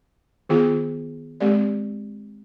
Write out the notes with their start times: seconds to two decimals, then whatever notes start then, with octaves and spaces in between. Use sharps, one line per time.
0.49 D#3 B3 F4 G#4
1.40 G#3 C4 G4 D5